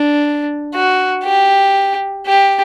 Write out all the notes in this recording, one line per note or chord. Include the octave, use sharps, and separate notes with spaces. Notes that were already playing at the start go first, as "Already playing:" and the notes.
Already playing: D4
F#4
G4
G4